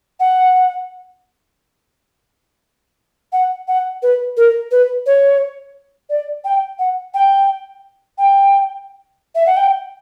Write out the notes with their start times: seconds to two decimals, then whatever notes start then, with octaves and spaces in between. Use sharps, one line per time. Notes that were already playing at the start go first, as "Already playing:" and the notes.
0.20 F#5
3.32 F#5
3.68 F#5
4.02 B4
4.37 A#4
4.71 B4
5.06 C#5
6.09 D5
6.44 G5
6.79 F#5
7.14 G5
8.18 G5
9.35 E5
9.46 F#5
9.57 G5